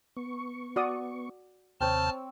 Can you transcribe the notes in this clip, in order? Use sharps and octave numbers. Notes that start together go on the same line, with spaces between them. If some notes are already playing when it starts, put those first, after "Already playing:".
B3 C#6
F#4 D5 D#6
D#2 C3 C4 C#5 A5 E6 F6 G6